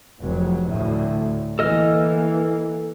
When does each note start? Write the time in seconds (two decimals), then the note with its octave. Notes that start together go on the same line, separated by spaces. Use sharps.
0.21 F1 C#2 F#3
0.67 D2 A2
1.59 E3 A#3 A4 D#5 F6